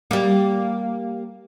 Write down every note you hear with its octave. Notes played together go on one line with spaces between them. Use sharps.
G3 A#3